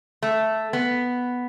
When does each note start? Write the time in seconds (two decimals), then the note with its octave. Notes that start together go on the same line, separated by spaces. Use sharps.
0.23 A3
0.73 B3